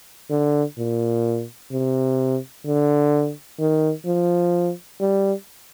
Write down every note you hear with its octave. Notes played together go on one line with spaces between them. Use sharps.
D3
A#2
C3
D3
D#3
F3
G3